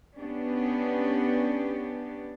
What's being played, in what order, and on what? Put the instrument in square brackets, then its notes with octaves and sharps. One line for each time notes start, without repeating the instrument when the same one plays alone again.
[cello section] B3 C#4 D4 G4